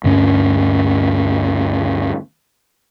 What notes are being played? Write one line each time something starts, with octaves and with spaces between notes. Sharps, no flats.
D2 G2 C#4